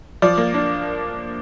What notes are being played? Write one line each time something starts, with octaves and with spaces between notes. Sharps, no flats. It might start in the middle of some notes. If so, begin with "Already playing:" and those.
F3 D5
A#3
D4